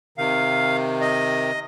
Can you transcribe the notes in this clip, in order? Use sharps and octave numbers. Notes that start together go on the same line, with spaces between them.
C3 D#3 F5
D#5